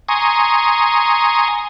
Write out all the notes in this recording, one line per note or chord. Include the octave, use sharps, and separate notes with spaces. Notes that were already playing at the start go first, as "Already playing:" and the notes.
G#5 A#5 C6 C#6 D#6